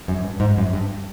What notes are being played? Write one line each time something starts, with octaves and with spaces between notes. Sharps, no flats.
F#2
G2
G#2
F#2
G2